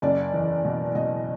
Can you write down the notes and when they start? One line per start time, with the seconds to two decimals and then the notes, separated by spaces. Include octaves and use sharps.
0.02 F#1 D5
0.33 E2
0.64 B2
0.95 B2 D#5